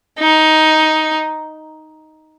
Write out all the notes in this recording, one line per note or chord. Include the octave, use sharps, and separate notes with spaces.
D#4